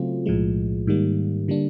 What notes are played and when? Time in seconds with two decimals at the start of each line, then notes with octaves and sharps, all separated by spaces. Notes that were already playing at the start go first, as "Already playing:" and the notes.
Already playing: C#3 F#3 A3 C4 F4
0.26 B1 A2 F3 G#3
0.87 G#2 D#3 G3 A#3
1.48 D3 G3 A#3 D4